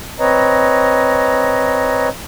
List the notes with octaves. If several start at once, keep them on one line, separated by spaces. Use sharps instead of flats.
C4 B4 C#5 D#5 A#5